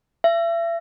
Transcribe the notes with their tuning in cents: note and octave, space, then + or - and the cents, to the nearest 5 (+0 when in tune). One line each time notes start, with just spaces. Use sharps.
E5 +35